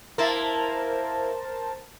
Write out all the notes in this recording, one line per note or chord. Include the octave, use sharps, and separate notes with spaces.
A#3 E4 A#4 C5 A5